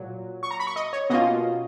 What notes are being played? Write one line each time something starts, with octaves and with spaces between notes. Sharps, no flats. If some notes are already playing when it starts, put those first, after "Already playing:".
Already playing: A#2 F#3
C#6
A#5
B5
C#6
D#5
C#5
B2 A#3 C#4 F4 D#5